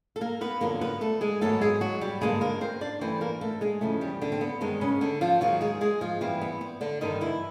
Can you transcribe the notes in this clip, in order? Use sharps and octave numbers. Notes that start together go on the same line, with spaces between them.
A4
A#3 A#4
B3 B4
F2 D3 F#3 A#3 A#4
B3 B4
A3 A4
G#3 G#4
G#2 D#3 F#3 A3 B3 A4
G#3 G#4
F#3 F#4
G3 G4
G2 D3 G3 G#3 A#3 G#4
A#3 A#4
C4 C5
D4 D5
G2 E3 A3 C4 C5
A#3 A#4
A3 A4
G#3 G#4
E2 C#3 F3 A3
G3 G4
D3 D4
C4
B3
G2 D#3 G#3 B3 C4
C#3 C#4
D3 D4
F3 F4
D#2 D#3 F#3 G#3 F#4
G#3 G#4
G#3 G#4
F3 F4
G2 E3 G3 C4
B3
C4
D3 D4
G2 D3 D#3 G3 D#4
E3 E4